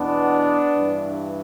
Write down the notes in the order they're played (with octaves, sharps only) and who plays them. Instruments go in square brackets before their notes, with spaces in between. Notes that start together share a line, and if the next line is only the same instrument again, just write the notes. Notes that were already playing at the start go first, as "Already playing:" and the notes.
Already playing: [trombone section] E2 B2 B3 D4
G2 E3